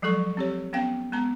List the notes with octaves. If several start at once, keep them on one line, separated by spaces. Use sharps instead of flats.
F3 F#3 G#3 A4 C#6
C4 G4 C#5
B3 C#4 F5 G5
G#3 B3 A5 A#5